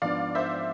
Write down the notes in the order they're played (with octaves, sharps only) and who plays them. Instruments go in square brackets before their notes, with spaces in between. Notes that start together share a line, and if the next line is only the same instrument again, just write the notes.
[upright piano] G#2 F3 B3 D4 [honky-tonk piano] D5 F5
[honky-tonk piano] C5 E5